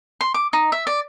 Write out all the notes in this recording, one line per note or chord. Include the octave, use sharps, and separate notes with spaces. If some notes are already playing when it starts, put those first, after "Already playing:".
C6
D6
D#4
E5
D5